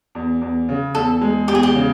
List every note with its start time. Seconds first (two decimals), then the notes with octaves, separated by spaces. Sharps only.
0.15 E2
0.41 E2
0.69 C#3
0.95 E2 A4
1.21 G#3
1.48 E2 G4
1.55 G#4
1.63 G4
1.75 C#3